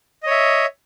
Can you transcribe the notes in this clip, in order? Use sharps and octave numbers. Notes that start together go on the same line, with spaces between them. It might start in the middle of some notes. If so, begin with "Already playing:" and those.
C#5 D#5 E5